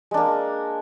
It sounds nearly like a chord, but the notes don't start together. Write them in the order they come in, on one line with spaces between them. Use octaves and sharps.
G#3 D4 A#3